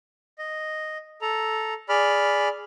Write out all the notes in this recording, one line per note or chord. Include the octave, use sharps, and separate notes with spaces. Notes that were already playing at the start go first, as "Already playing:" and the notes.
D#5
A4 A#5
G#4 D5 B5 F6